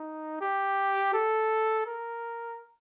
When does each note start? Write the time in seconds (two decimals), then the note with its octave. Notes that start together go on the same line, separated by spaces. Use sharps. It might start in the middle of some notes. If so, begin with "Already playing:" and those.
Already playing: D#4
0.41 G4
1.14 A4
1.87 A#4